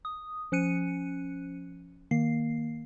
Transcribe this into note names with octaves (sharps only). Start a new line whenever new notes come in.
D#6
F3 C#4 F#6 C#7 D#7
D#3 A#3 C7